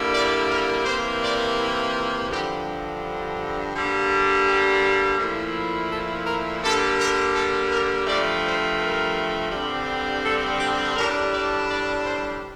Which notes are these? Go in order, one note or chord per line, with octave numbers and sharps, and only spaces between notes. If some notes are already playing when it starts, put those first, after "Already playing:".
Already playing: D3 G3 A#3 E4
D5
A#4
C3 E3 A#3 C5
D5
E4
F4
G2 D3 F3 G4
D3 G3 A#3
G4
A#2 F3 A3 E4
A4
A#4
D3 G3 A#3 A4
A#4
A4
A#4
G2 F3 A3 D5
C5
A#4
G2 D3 G3 C4
A4
G4
A2 G3 D4 A#4
D5
D5
C5